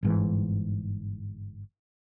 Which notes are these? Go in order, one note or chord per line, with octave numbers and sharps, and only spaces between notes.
G1 G#2 E3